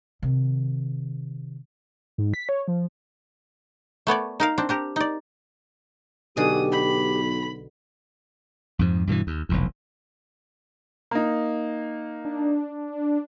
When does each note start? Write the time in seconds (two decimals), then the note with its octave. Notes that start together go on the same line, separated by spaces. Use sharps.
0.22 C3 D#3
2.18 G#2
2.34 B6
2.49 C#5
2.68 F3
4.07 A3 B3 C#5 D5
4.40 D#4 A#4 F5
4.58 C4 D4
4.69 D4 G4 A#4
4.96 D#4 D5
6.37 B1 B2 D3 G4 G#4 D#6
6.72 B5
8.79 F2 G#2 F3
9.07 G2 B2 D3 E3
9.27 D#2
9.49 F1 B1 E2
11.11 A#3 D#4
12.25 D4